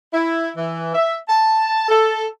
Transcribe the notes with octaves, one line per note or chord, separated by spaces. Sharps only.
E4
E3
E5
A5
A4